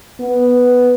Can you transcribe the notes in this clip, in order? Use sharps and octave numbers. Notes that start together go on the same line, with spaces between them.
B3